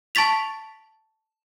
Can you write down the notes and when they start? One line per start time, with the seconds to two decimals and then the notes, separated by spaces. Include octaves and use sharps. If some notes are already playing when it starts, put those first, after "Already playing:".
0.15 A5 C#6 A6 B6 F7